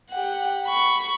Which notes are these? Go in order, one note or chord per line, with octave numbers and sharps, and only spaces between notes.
G4 F#5
B5 C#6